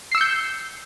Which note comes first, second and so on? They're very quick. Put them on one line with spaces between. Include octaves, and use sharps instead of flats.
C7 E6 C#7 G6